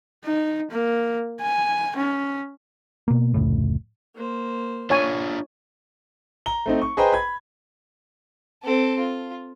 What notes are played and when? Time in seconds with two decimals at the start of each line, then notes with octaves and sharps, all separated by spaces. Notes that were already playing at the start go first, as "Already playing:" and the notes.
0.24 D#4
0.71 A#3
1.41 G#5
1.97 C#4
3.08 B2 A#3
3.34 F1 C#2 A2
4.15 A#3 C5
4.90 D4 F4 C#5 G#5
6.46 A#5 G7
6.66 A3 C4 D#4
6.82 C#6
6.97 G#4 B4 C5 D#5 G5 A#5
7.13 B5 G#6
8.63 C4 A4
8.99 F4